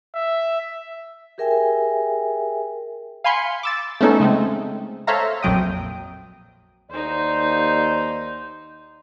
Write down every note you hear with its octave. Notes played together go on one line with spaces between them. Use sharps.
E5
G4 G#4 A#4 E5 G5 G#5
F5 G#5 B5 C6 C#7
D6 E6 A6
A3 B3 C#4 D#4 A4
C#3 G#3 A3 C4
A4 C5 C#5 E5 F5 A#5
A#1 F2 F#3 G5 D#6
D#2 D#4 C5 D5